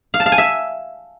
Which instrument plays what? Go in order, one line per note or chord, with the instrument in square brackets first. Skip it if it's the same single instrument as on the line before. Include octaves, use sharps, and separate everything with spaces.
[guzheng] F5
A5
F5
G#5
E5